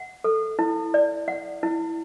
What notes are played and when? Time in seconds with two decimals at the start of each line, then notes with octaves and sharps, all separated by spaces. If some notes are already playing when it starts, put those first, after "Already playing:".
Already playing: F#5
0.24 A4
0.59 E4
0.94 D5
1.28 F#5
1.63 E4